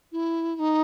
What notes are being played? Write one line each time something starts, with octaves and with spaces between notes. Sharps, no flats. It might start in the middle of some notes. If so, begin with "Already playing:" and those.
E4
E4
D#4